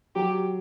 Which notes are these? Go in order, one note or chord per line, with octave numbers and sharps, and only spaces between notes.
F#3 G4